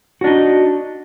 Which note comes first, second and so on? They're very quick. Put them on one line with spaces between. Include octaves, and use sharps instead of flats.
F#4 D4 D#4